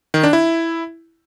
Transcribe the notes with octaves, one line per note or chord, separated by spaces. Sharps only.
D#3
D4
E4